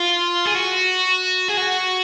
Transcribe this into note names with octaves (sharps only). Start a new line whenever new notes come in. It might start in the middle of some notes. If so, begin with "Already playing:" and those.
Already playing: F4
G#4
F#4
G#4
F#4